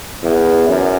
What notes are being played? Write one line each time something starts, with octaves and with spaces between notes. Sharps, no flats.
E2
F#2